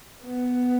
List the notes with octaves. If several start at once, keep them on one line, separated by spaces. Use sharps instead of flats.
B3